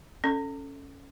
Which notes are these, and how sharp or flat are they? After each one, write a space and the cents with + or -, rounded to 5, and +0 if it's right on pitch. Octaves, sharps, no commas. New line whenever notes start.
C#4 +0 A4 +0